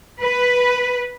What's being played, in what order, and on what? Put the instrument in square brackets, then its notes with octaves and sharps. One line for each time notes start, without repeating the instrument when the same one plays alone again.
[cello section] B4